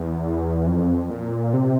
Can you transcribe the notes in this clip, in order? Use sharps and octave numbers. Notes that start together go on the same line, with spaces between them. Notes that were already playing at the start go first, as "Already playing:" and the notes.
Already playing: E2
F2
A#2
C3